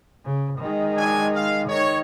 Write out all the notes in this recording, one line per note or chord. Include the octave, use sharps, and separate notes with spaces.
C#3
D#3 G#3
F#3 D4 G#5
F5
D#3 C#5